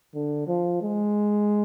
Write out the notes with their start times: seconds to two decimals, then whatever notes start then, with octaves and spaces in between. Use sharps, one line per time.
0.15 D3
0.48 F3
0.82 G#3